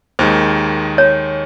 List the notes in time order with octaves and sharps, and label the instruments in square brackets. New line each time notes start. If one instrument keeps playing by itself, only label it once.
[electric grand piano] D#2 D#3 G#3 [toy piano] C5
[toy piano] C#5